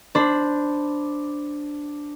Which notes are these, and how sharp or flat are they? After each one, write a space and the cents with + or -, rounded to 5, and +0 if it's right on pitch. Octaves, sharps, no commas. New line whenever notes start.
D4 +0 C5 +0 B5 +0